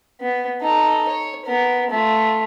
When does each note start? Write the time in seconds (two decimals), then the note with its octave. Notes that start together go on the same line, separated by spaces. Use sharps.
0.21 B3
0.61 D#4 A4
1.08 C#5
1.46 B3 A#4
1.90 A3 F4